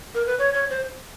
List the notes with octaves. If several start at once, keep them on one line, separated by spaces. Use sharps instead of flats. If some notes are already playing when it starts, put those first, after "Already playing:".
A#4
B4
C#5
C#5
C5